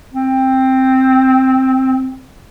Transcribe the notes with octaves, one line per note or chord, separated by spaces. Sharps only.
C4